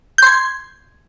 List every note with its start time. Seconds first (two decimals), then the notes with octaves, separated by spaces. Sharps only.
0.18 G6
0.23 C6
0.27 G#6